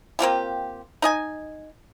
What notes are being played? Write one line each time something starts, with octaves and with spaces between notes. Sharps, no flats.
A#3 C4 F4 G4
D#4 D#5 G#5